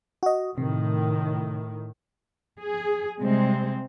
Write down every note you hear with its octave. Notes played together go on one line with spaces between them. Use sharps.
F#4 D#5
A2 C3 D#3
G#4
C3 G3 G#3 C4